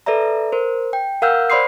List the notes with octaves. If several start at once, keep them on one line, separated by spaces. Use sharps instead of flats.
A4 B4 D5 E5 A#5
A#4 C5
G5
A#4 F5 F#5 E6 F6 G6
C5 D5 B5 C6 D#6 C7